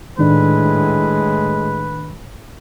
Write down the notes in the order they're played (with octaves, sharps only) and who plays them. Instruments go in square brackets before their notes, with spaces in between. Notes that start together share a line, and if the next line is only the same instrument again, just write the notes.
[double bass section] A2 [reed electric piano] D#3 D4 [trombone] G#3 [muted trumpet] B4